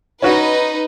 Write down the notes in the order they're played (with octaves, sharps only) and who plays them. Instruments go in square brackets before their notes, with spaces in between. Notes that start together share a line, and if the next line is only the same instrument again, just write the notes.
[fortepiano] C#4 F#4 [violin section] D#4 B4